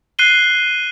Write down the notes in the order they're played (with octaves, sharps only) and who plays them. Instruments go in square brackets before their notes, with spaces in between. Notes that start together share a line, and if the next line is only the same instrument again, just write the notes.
[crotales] F#6 C7 D#7 G7